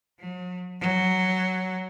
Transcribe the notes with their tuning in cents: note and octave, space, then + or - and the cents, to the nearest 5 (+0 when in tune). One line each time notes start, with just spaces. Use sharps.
F#3 -40
F#3 +5